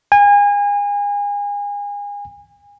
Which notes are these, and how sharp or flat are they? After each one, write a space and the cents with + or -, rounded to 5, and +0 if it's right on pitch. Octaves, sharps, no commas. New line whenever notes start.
G#5 -30